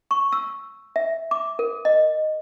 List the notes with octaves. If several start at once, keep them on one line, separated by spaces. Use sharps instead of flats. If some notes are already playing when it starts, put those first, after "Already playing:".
C#6
E6
E5
D6
A#4
D#5